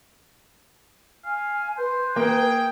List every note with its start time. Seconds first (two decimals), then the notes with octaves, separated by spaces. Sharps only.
1.25 F5 G#5
1.77 B4 C5
2.16 A#3 G#4 G5